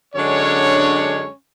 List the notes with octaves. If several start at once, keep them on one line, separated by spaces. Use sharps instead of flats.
F#2 D3 G#3 C#4 D4 C#5